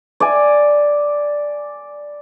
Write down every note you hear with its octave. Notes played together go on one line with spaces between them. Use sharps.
D5 G#5